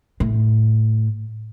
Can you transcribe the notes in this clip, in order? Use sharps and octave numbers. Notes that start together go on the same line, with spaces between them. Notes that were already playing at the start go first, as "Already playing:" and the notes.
A2